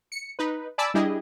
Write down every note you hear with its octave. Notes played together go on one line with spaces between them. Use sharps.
C#7
D#4 B4
D5 G#5 A5 B5 D6 E6
G3 D4 E4 G4 G#4 D#5